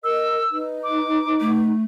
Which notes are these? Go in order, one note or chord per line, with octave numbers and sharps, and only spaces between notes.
A#4 D#5 E6
D#4 B4
D6
A3